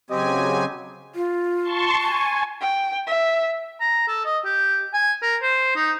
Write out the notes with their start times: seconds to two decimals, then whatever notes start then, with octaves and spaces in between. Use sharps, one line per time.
0.10 C#3 F#3 C4 G4 D#5 G#5
1.15 F4
1.62 A5 C6 C#6
2.01 G#5 C#6
2.61 G5
3.07 E5
3.81 A#5
4.08 A4
4.25 D#5
4.45 G4
4.94 G#5
5.22 A#4
5.42 C5
5.76 D#4